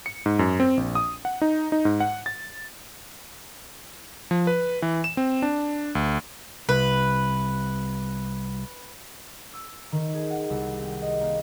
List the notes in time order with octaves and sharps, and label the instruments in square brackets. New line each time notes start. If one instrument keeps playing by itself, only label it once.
[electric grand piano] C#7
G#2
F#2
C4
A#1
D#6
F#5
D#4
D#4
G#2
F#5
A6
F3
B4
E3
E7
C4
D4
D2
[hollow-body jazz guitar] C2 [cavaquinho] B4
[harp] E6
E7
D#3
G#4
F#5
C2
C4
D#5
A#3